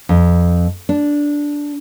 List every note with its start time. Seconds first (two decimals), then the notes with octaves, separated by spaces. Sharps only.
0.09 F2
0.89 D4